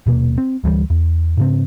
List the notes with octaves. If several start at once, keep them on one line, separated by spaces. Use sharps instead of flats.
D#1 B2 A#3
C4
D2 E3 F3 G3
E2
G#2 C#3 C4